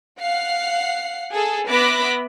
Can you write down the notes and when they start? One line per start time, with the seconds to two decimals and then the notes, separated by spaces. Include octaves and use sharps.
0.20 F5 F#5 C7
1.32 G#4 A4
1.69 B3 E5 B5 D6 F#6 A#6